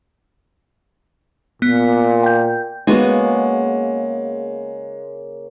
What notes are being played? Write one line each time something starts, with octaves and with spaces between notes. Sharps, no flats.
A#2 B3
G5 G6
C#3 G#3 A#3 B3 F#4 G#5